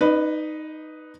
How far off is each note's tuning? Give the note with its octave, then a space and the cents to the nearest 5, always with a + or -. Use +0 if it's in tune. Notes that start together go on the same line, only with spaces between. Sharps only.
D#4 +0 B4 +0 D5 +40